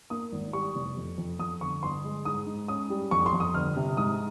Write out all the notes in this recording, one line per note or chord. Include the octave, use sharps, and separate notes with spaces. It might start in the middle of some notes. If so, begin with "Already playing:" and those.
A#3 D#6
G#1
G3 C#6
F1
F2
F2
F2 D#6
G1 C#6
G1 C6
G#3
G#2 D#6
G#2
C#4 D#6
G3
F2 C#6
C6
F2
D#6
G1 F6
C3
G#2 D#6